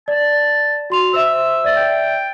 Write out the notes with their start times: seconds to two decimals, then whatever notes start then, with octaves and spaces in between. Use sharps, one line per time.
0.08 D5 A5
0.90 F#4 C6 F7
1.14 C5 E5 E6
1.64 D5 E5 A6
1.77 G5